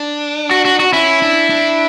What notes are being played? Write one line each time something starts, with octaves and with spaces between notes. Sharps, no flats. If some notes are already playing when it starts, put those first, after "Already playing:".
Already playing: D4
F#4
F#4
F#4
C#4 E4
D4
D4